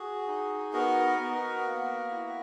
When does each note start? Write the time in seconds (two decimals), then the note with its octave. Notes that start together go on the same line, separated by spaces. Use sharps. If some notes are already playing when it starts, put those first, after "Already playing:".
Already playing: F#4 G#4
0.28 D#4
0.73 B3 F#4 A#4
1.19 B3
1.65 A#3
2.11 E4